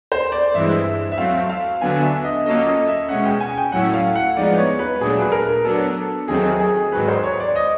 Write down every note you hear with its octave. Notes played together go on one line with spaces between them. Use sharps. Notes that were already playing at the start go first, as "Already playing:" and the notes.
C5
D5
G2 E3 G#3 C4 E4 E5
E5
F#3 A3 C4 F5
F5
D3 F#3 B3 D4 G#5
E5
D#5
F#3 A#3 C#4 F4 A4 D#5
D#5
E5
B2 G#3 C#4 F#5
G5
G#5
G5
A2 F#3 A3 C#4 E4 F#5
F5
F#5
F3 G#3 B3 D#4 D5
C#5
B4
A#2 F#3 A3 D4 G#4
B4
A#4
F#3 B3 D4 A4
D#2 D#3 F#3 A3 C4 G#4
G#4
G#2 D#3 F#3 B4
C5
C#5
D5
D#5